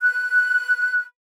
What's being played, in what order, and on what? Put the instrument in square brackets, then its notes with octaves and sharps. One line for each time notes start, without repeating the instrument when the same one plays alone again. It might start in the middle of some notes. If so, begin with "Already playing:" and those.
[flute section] F#6